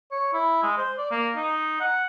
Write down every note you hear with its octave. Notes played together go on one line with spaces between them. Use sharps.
C#5
E4
G#3
C5
D5
A#3
D#4
F#5